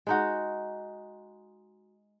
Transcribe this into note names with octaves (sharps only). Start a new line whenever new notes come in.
G#3 D#4 F#4